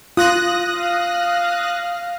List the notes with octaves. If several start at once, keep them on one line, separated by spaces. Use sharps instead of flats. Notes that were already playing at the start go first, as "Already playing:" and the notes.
F4 D#6 F#6 A#6
F5